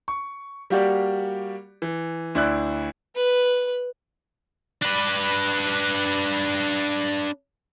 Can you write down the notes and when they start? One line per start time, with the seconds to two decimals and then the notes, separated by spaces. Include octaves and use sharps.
0.08 C#6
0.70 G3 A#3 F#4 G4 D5
1.82 E3
2.35 D2 E4 D5 F#6
3.16 B4
4.82 D4 B4